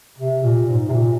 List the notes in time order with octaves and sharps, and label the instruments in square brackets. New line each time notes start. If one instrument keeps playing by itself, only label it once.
[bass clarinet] C3
A#2
G#2
C3
A#2